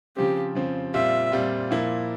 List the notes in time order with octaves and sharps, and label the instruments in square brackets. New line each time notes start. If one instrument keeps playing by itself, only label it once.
[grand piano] C#3 F3 C4 [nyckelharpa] G4
[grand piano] C#3 F3 C4
[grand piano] A#2 G3 C4 F4 [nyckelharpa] E5
[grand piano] A#2 G3 C4 F4
A#2 F3 A#3 E4